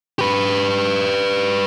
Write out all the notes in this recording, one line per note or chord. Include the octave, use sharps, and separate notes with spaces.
G4 B4